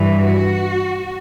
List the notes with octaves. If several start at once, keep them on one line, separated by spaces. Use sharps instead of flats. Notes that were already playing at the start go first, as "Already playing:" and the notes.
Already playing: G2 E3
F#4